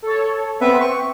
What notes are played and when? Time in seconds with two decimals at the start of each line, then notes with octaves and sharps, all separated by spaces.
0.02 A4 C#5
0.61 B3 C4 B4 E5
0.81 C#6